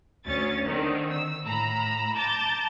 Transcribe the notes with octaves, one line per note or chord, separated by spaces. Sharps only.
D2 C#4 A6
D3 D#3 C4
E6
A2 A#5 B5 E6
A5 A#5 D6 G6 A6